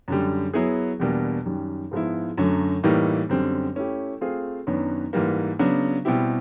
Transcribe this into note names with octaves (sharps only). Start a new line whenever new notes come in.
F#2 D3 G3
F#3 B3 E4 G#4
E2 B2 G3 A#3 D4
F#2 D#3 G3
G#2 F3 G#3 B3 E4
F#2 D3 F#3 A3
A2 E3 G3 A#3 D#4
F#2 D3 G3 C4
A3 C#4 E4 G4
A3 C4 F4 G#4 C5
F#2 D#3 F#3 B3 D4
G#2 E3 G3 A#3
C#3 F#3 B3 D4
B2 G3 C4 E4 G4